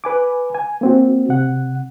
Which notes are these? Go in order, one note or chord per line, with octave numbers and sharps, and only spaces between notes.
B4 G#5 D6
G#5
A#3 C4 F#4
C3 F#5